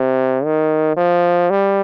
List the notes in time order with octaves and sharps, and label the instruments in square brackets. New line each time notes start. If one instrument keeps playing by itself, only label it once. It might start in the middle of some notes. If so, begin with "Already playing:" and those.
Already playing: [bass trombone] C3
D#3
F3
G3